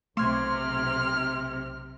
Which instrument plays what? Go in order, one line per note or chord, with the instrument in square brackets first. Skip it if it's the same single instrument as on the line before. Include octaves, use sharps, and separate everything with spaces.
[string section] B1 C3 [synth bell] A3 [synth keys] C6 G#6 [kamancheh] F6